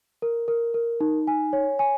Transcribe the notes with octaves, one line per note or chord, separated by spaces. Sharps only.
A#4
A#4
A#4
D#4
G#5
C#5
G#5